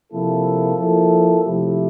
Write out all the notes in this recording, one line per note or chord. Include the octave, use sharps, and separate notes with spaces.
C3 F3 A#3 E4 A4
F3 A#3 E4 A4
C3 F3 A3 E4 G4